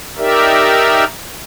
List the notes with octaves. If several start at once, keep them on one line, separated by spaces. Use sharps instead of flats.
D#4 G4 A#4 D5 E5